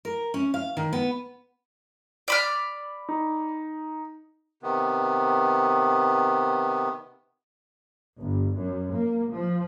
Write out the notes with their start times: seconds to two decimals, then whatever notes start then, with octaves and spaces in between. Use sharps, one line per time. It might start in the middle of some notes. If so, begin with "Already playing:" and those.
0.05 A#4
0.34 C#4
0.54 F5
0.77 D#3
0.93 B3
2.28 D5 B5 F6
3.09 D#4
4.63 C3 D#3 B3
8.21 G1
8.58 F#2
8.93 A#3
9.33 F3